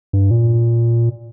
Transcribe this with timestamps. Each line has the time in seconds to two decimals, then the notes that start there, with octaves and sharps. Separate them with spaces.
0.13 G2
0.31 A#2